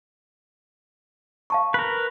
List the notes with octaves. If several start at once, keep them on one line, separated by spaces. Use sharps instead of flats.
F5 A5 C#6
A#4 B4